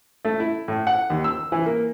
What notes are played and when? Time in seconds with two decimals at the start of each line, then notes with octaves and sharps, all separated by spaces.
0.25 A3
0.40 E4
0.68 A2
0.87 F#5
1.10 D#2
1.24 E6
1.52 E3
1.66 A#3